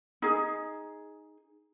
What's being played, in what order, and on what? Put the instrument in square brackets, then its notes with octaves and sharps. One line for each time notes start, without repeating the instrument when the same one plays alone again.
[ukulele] D#4 G#4